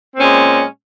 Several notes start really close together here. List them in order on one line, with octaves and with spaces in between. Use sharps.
C4 A#2 C#4 G#3